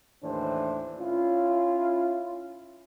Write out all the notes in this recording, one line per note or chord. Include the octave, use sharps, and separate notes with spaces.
D#2 A2 E3 D4 C5
C#4 E4 F4